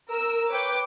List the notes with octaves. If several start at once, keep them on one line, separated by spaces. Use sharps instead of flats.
A#4 E6
B4 C#5 G5 D6